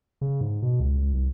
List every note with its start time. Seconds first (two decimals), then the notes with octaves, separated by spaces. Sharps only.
0.21 C#3
0.41 G#2
0.62 B2
0.80 C#2
0.97 C#2
1.13 C2